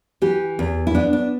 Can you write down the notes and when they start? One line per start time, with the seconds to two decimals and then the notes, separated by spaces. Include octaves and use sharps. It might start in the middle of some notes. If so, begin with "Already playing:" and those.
0.22 E3 G4
0.59 E2
0.87 E4
0.95 B3 D4
1.13 D4